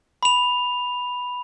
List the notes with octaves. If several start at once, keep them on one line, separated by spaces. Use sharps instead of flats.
B5 F7